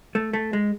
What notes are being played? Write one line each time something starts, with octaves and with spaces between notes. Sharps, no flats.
A3
A3
G#3